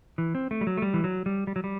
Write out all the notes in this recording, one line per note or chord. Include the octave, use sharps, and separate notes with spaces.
E3
C4
A3
G3
F#3
A3
G3
E3
F#3
G3
G3
F#3
G3